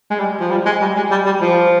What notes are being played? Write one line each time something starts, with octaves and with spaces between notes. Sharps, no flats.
G#3
G3
F3
G3
G#3
G3
G#3
G3
G3
F3